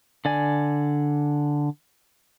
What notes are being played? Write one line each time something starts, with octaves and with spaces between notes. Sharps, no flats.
D3 D5 G#5